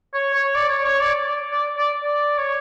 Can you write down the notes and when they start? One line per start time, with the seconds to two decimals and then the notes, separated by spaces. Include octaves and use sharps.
0.14 C#5
0.34 C#5
0.55 D5
0.69 C#5
0.85 C#5
1.00 D5
1.26 D5
1.51 D5
1.77 D5
2.03 D5
2.38 C#5